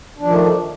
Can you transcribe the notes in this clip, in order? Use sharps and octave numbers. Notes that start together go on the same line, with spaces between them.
D#3 F3 A3 D4